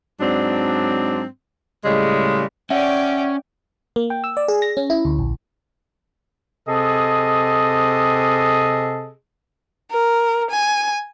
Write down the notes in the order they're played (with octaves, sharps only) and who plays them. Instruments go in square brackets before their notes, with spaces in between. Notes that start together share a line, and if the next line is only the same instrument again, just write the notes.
[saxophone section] G#2 F#3 C4 D4
A2 C#3 G3 G#3
[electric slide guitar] C#4 [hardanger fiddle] D5 G5 [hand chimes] E5 F#5
[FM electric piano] A#3
G5
E6
D5
G#4
A#6
C#4
E4
D2
A#1
[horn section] C3 G#4 A4 D#5
[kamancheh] A#4
G#5